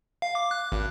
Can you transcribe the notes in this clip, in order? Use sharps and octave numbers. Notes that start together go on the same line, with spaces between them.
F5
D6
F#6
G#1